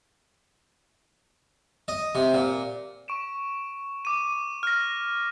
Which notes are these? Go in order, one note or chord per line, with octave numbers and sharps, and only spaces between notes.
D#5
C3
A#2
C#6 D7 E7
D6 D#7
F6 A#6